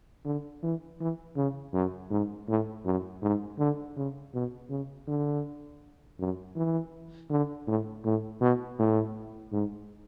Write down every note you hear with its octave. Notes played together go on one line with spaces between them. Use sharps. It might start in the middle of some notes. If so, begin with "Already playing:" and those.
D3
E3
E3
C#3
F#2
G#2
A2
F#2
G#2
D3
C#3
B2
C#3
D3
F#2
E3
D3
A2
A2
B2
A2
G#2